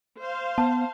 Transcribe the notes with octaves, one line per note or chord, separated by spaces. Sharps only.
C5 F5
B3 A5